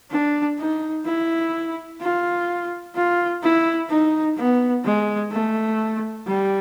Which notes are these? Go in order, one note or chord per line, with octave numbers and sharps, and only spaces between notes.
D4
D#4
E4
F4
F4
E4
D#4
B3
G#3
A3
G3